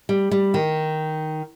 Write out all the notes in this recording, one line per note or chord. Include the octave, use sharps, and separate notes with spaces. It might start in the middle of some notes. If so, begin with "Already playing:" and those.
G3
G3
D#3